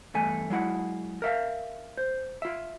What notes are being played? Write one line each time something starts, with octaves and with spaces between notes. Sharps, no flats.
E2 G2 A3 G#5
F#3 G#3 E4 F#5
A#4 E5 F5
C5
F4 E5